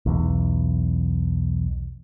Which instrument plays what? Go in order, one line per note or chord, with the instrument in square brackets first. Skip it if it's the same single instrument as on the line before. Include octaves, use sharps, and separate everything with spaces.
[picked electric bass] B1 E2